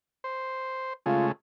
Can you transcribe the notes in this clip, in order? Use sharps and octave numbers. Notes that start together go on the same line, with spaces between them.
C5
C#3 G#3 A3 F4